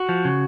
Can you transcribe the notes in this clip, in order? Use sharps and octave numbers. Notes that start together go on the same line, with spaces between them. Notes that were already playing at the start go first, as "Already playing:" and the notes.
Already playing: F#4
F3
C#3